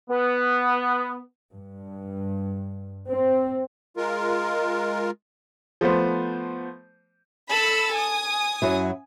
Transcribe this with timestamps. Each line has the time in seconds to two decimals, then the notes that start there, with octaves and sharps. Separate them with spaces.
0.10 B3
1.54 G2
3.08 C4
3.97 G#3 F4 A#4
5.81 F3 A3 B3 C5
7.50 A4 B5 E6
7.94 G#5 D#6
8.62 F#2 F#3 E4